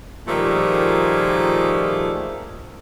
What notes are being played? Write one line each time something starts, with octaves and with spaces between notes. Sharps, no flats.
A#2 D#3 F3 G3 A3 G#4